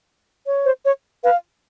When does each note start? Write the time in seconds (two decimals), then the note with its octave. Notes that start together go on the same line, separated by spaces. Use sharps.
0.46 C#5
0.65 C5
0.85 C#5
1.23 B4 F5